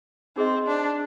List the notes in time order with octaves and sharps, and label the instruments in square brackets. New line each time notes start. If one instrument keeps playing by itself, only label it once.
[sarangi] C4 [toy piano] D#4 G#4 C5 D#5
[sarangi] D4